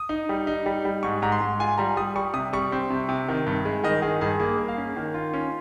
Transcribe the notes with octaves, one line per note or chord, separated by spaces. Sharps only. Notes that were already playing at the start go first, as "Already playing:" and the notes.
Already playing: D#6
D#4
G3
D#4
G3
G3
G#2 C#6
G#2 A#5
C6
G#2
F4 G#5
G3 A#5
G3 D#6
G3 C#6
C3 D#6
G3 C#6
C4
C3
C3
D#3
G2
G#3
D#3 D#5
D#3 G#4
G2 G#4
A#3 G#4
A#3
F5
C#4
D#3
F4
C#4